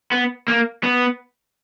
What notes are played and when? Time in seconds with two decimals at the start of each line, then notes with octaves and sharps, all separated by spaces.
0.12 B3
0.48 A#3
0.84 B3